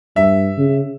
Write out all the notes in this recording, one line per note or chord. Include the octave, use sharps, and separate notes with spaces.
G2 E5
C#3